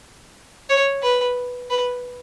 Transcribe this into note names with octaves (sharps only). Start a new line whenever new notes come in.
C#5
B4
B4